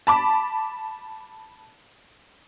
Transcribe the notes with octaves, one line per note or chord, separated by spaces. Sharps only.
A5 B5 D6